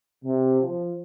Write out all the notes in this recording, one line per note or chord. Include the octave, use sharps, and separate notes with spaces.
C3
F3